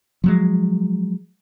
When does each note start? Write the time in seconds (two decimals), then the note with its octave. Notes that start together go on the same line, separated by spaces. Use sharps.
0.24 F3 F#3 G#3